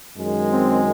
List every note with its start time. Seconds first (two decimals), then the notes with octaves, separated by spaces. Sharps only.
0.17 F#2 D#3 G#3
0.50 C4